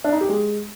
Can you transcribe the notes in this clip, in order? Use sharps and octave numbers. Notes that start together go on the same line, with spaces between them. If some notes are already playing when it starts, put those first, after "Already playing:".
D4
D#4
G4
G#3